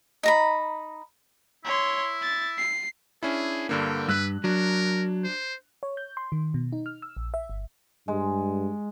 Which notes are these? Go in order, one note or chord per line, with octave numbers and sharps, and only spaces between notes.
D#4 A#5 B5
E4 C#5 C6
A6
C7
C#4 D4 E4 G#4
G2 D3 A#3 G5
G2 B4 E6 F#6
F#3 D4 A#4
C5
C#5
G6
C6
D#3
B2
D#4
F6
E6
A#1
E5
G1
G2 G#3